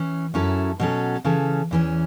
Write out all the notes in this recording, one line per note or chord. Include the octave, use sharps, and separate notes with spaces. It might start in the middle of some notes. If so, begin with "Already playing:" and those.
Already playing: E3 C#4
F#2 F#3 C#4 E4 A4
B2 F#3 C#4 A4
C#3 E3 C#4 A4
E2 E3 C#4